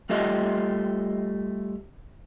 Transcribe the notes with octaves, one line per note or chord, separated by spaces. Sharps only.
G3 A3 F4 G4 D#5 E5